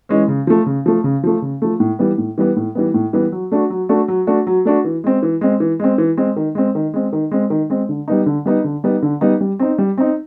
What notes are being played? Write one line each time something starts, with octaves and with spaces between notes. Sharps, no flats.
E3 G#3 C#4
C#3
F3 A3
C#3
F3 A3
C#3
F3 A3
C#3
F3 A3
A2
E3 G3 B3
A2
E3 G3 B3
A2
E3 G3 B3
A2
E3 G3 B3
F#3
A3 D4 F#4
F#3
A3 D4 F#4
F#3
A3 D4 F#4
F#3
A3 D4 F#4
E3
G#3 C4
E3
G#3 C4
E3
G#3 C4
E3
G#3 C4
D#3
G#3 C4
D#3
G#3 C4
D#3
G#3 C4
D#3
G#3 C4
D3
G3 B3 D#4
D3
G3 B3 D#4
D3
G3 B3 D#4
D3
G3 B3 D#4
G3
C4 D#4
G3
C4 D#4